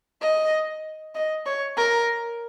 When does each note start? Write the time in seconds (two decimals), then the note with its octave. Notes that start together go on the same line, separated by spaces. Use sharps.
0.22 D#5
1.15 D#5
1.46 C#5
1.77 A#4